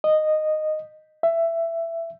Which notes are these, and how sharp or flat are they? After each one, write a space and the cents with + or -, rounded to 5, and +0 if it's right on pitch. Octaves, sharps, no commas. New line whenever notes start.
D#5 -10
E5 +15